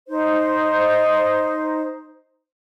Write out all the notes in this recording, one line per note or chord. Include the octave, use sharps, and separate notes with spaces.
D#4 C5